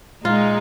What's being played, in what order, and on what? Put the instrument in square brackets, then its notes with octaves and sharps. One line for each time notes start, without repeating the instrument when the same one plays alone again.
[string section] A#2 G#3 D#4 [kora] F4